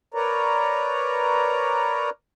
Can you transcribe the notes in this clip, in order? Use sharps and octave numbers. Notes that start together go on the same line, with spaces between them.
A#4 B4 C#5 D5 A#5